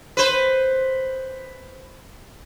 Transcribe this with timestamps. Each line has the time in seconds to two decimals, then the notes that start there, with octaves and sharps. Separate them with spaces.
0.17 B4 C5